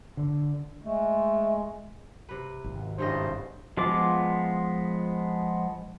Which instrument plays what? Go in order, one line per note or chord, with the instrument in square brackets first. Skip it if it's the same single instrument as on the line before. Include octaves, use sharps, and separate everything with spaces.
[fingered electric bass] D3
[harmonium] G#3 [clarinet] A3
[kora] C3 B4
[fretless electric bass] G#1
[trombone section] A1 C#3 C5 [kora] G2 G3 D#5
[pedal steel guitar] F3 G#3 B3 F4 D6